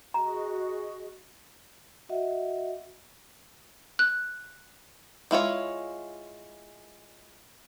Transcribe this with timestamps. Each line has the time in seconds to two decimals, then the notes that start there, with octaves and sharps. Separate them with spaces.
0.14 F#4 G#4 D#5 A#5
2.09 F#4 D#5 E5 F#5
3.99 F#6
5.31 G#3 E4 F4 C#5